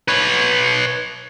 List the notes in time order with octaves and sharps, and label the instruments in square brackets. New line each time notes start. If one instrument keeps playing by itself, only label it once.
[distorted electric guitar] B4 C#5